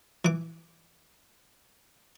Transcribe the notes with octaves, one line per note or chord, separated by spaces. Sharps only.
E3 D6